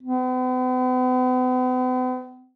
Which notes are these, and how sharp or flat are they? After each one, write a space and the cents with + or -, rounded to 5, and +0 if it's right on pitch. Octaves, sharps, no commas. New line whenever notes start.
B3 +45